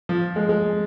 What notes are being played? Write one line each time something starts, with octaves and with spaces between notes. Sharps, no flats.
F3
G#3
G#3